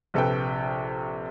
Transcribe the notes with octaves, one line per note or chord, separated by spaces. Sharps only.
A#1 C3 A4 B4 G5